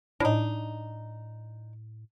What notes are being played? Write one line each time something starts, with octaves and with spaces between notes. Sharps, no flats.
A2 D4 D#4